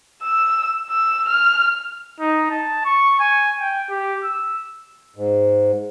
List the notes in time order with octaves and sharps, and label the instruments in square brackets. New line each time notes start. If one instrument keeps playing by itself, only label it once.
[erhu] E6
E6
F6
[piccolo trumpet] D#4
A5
C#6
G#5
G5
G4
E6
[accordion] G#2